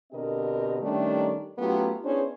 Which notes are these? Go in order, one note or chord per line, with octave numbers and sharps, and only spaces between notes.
B2 D3 C4 G4 A#4 D#5
D#3 G3 A3 C#4 D4 G4
F#3 A3 B3 C#4 F4 G4
B3 C#4 D4 E4 G#4 C5